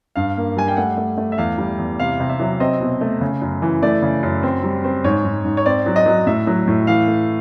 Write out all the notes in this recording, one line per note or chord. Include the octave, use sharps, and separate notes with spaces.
G2 F5
A#3
G3 G#5
G5
A3 F#5
A3
A3
E5
E2 F5
G3
E2
C3 F5
C3
E5
F#3
C4 D#5
B2
A3
C#3
F#2
E3
A3 D5
C#3
F#2
C4
G3
C4
G#2 C#5
G#2
G#2
C#5
C4 D5
F#3
D#5
F#3
A2 E5
F#3
A2
E3 F5
A3